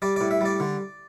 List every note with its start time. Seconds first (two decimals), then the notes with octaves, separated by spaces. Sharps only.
0.02 G3 D5
0.16 A2 D5
0.31 E5
0.41 G3 D5
0.60 D3